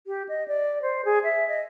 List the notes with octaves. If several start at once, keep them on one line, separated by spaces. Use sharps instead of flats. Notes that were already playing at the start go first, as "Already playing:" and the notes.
G4
D#5
D5
C5
G#4
E5
D#5